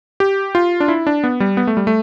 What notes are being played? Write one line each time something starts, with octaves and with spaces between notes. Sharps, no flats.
G4
F4
D4
E4
D4
B3
G3
B3
A3
G3
A3